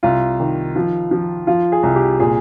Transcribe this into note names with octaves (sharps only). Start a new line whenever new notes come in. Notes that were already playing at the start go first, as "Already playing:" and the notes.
C2 F4
D#3
F3
F3
F3 F4
G#4
C2
G4
A#2 G#4